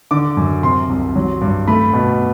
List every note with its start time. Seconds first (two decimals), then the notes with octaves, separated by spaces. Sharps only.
0.11 D3 D6
0.37 F#2
0.63 C3 C6
0.89 C2
1.15 F#3
1.41 G2
1.68 A3 B5
1.93 B2